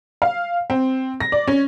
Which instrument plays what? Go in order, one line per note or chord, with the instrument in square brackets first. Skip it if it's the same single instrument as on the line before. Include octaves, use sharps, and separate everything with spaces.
[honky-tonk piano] F5
C4
A#6
D5
C#4